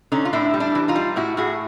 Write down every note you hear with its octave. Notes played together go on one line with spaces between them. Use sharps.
D3 C#4 D#4
F4
A2 D4 E4
G3
D4 E4
E3
D#4 F4
G3
A2 E4 F#4
A2 F#4 G#4